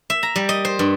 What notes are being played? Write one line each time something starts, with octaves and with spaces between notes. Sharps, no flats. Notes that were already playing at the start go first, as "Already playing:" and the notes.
E5
A#5
G3
D#5
C5
G2